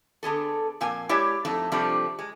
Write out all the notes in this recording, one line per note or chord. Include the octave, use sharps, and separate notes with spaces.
D3 B3 G#4 A4
F2 A#2 A#3 G#5
G#3 E4 G4 C#5 D5
F2 A3 D#4 A4
C3 F3 G3 A3 D4
G#3